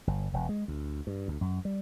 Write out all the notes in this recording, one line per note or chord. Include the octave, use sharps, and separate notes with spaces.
G1
E1
G#3
D2
G2
D2
F#2
G3